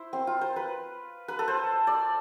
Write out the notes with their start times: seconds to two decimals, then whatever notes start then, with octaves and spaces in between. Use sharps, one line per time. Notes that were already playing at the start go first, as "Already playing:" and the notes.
Already playing: E4 C5
0.13 C4
0.27 F4
0.41 C5
0.56 B4
1.28 B4
1.39 A4
1.48 C5
1.87 D5